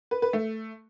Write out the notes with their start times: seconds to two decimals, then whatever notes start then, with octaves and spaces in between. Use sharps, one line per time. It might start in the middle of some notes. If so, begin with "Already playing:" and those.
0.11 B4
0.22 B4
0.33 A3